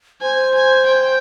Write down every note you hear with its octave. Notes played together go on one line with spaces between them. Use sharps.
C5 G#5
G#5
G5